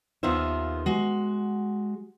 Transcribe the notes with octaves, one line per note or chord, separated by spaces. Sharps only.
D#2 D#3 B3 F4 C5 E5
G#3 F#4